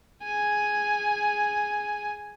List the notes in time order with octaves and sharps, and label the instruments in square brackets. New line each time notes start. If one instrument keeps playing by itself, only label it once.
[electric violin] G#4 G#5